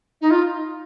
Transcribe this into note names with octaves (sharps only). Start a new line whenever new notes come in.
D#4
F4